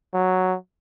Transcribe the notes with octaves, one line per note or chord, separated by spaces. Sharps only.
F#3